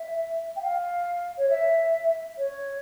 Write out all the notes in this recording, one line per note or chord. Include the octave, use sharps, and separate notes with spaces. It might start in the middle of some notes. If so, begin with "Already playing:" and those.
Already playing: E5
G5
F5
C#5
E5
C#5